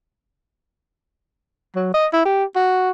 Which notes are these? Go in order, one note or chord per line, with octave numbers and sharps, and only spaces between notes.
F#3
D#5
E4
G4
F#4